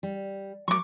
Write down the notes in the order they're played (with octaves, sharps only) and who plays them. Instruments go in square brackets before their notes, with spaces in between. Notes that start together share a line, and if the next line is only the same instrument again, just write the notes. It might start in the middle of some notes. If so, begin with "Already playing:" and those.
[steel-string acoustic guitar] G3
[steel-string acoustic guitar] F#3 A#4 [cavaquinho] C#6 D6